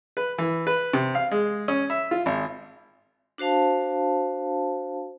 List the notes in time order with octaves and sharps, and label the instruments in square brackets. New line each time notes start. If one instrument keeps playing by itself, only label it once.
[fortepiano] B4
E3
B4
C3
F5
G#3
C#4
E5
F4
G#1
[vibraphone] D4 F#4 C5 F5 A5